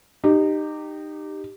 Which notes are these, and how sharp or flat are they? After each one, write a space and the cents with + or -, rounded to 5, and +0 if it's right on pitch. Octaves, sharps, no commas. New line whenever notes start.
D#4 -25 G4 +0